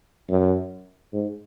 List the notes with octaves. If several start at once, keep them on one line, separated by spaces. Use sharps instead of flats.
F#2
G#2